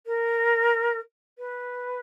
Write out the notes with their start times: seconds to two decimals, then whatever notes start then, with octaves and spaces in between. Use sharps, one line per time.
0.06 A#4
1.38 B4